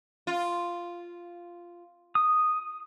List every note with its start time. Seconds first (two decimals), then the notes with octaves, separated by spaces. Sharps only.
0.27 F4
2.15 D#6